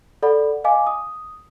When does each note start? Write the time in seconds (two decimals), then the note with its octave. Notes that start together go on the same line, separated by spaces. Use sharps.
0.23 A4 D5 F#5 B5
0.64 D#5 F5 G#5 D6
0.87 D#6